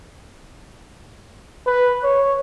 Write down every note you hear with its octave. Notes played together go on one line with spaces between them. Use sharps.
B4
C#5